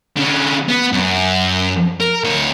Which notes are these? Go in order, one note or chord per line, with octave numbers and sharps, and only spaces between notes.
D3 C#4
B3
F#2
A#4
D2 C#5